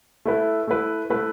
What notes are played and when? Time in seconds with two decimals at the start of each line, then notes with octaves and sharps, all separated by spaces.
0.25 A3 E4 B4
0.67 A3 E4 B4
1.10 A3 E4 B4